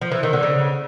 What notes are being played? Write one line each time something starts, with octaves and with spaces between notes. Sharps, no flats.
F3
E3
D#3
D3
C#3